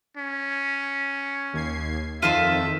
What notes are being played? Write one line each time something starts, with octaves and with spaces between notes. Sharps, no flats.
C#4
D#2 G#6 C7
F2 D#3 F4 A4 C5 E5